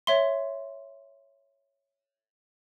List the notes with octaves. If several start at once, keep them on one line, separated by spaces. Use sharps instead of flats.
C#5 E5 C6